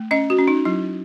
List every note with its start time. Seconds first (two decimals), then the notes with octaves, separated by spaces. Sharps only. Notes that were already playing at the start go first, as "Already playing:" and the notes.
Already playing: A3
0.11 C#4 D#5
0.30 F#4
0.39 C#4
0.48 D#4
0.65 F#3 E4